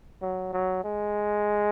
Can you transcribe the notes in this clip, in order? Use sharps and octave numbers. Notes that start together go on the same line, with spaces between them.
F#3
F#3
G#3